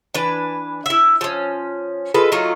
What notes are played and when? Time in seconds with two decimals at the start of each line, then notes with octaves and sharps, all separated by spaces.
0.14 E3 D4 B4
0.86 E4 E5
1.21 F3 C#4
2.14 G#3 F4 A4 B4
2.32 F#3 A3 D#4 F4